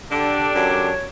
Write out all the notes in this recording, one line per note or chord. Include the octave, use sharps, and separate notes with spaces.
D3 D4 G4 A4 D5
F#2 C#5